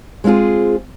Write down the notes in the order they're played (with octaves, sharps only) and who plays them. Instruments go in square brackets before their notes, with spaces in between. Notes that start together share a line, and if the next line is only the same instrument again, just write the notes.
[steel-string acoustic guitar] G#3 C4 D#4 F4 G#4